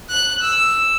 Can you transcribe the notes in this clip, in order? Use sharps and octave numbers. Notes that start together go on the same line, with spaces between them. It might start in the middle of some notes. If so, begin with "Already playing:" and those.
F#6
E6